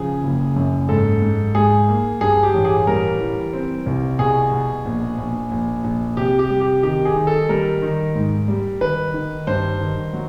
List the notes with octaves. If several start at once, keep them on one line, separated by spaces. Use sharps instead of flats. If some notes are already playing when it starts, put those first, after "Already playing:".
Already playing: C#3 F3 G#4
F#1
F#2
G#2 A4
G#2
G#2 G#4
A#3
G2 G#4
G4
A1
G#4
G3 A#4
E3
C4
C2
B2 G#4
B2
A#1
A#1
A#1
A#1
C3 G4
G4
G3
G4
D#3 G4
G#4
D#3
A4
G3 A#4
D#3
G#2
G3
D#3 B4
D#3
G2 C5
D#3
F#3